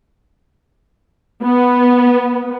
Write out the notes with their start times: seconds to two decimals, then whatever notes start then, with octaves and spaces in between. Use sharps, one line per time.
1.43 B3